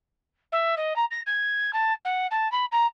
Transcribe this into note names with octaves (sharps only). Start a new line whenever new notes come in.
E5
D#5
A#5
A#6
G#6
A5
F#5
A5
B5
A#5